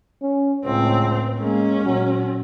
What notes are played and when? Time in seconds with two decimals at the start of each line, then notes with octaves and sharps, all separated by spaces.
0.22 C#4
0.65 C#2 A2 C4
1.40 G#3 A#3 C#4
1.85 A#2 F#3